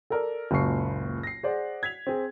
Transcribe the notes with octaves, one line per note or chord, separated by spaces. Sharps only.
A4 A#4 D5
F#1 C#2 A#2 C#6 C7
A#6 C7
G#4 C5 D5 F#5
G#6 B6 F7
C4 G#4